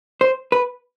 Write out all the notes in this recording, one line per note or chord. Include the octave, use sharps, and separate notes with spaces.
C5
B4